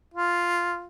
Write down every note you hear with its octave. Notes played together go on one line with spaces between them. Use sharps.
F4